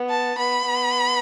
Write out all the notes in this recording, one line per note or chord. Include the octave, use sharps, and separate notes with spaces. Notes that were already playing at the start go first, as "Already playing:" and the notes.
Already playing: B3
A5
B3 B5
B3